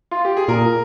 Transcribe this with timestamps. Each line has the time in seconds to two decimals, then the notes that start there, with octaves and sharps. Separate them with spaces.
0.11 F4
0.25 G4
0.37 G#4
0.48 A#2 A#4